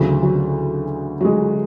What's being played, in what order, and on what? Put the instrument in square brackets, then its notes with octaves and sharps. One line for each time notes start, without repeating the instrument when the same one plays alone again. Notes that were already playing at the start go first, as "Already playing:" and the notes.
Already playing: [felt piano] D2 C#3 E3 F#3
F#3
F#3
G#3